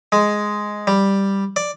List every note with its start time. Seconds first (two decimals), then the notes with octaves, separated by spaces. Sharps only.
0.12 G#3
0.87 G3
1.56 D5